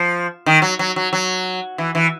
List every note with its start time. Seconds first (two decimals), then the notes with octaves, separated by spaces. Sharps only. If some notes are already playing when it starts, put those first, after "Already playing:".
Already playing: F3
0.46 D#3
0.62 F#3
0.79 F#3
0.96 F#3
1.13 F#3
1.78 E3
1.95 E3